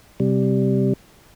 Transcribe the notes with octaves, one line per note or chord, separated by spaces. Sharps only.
C3 G3